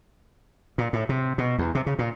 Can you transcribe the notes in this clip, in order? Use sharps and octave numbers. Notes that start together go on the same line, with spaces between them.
A#2
A2
C3
B2
E2
C3
C#3
A#2